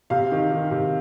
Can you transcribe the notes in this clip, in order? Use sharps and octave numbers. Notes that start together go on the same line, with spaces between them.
C3 F5
D#3
D#3
C3